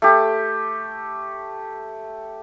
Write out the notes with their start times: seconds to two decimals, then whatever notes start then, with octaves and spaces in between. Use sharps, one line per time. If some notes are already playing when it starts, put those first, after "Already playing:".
0.02 A3 G4